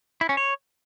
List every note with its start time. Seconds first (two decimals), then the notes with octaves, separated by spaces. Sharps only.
0.21 E4
0.29 C#4
0.37 C#5